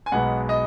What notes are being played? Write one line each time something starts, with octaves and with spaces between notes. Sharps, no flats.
G#5
B1 B2 G#3 B3 F#5
D#5